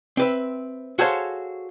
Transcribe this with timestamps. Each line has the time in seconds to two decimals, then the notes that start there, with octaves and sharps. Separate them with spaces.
0.17 C4 B4 E5
0.99 F#4 G#4 A4 C5 C#5 F5